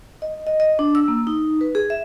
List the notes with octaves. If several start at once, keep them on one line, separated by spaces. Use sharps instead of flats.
D#5
D#5
D#5
D4
E6
A#3
D#4
B4
G#4
E5